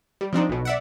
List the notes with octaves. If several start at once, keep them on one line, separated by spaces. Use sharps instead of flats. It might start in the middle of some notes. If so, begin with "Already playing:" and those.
G3
F3 C4 D4 D#4
B1 B2
D5 E5 F#5